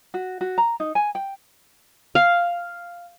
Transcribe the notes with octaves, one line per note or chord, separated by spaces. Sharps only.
F#4
F#4
A#5
D#4
G#5
G5
F5